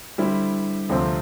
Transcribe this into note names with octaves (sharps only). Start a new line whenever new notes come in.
D3 G3 C4 E4
D2 C3 F3 C4